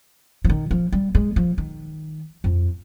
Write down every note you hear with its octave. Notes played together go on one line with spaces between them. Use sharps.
F3
D#3
F3
G3
G#3
F3
D#3
F2